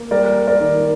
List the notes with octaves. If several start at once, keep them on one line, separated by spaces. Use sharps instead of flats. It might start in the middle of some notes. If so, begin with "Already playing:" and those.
Already playing: A#3
G3 A#4 D5
G3
A#4 D5
D#3